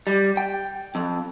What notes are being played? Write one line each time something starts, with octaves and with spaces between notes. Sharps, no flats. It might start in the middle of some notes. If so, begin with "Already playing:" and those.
G3
G5
F2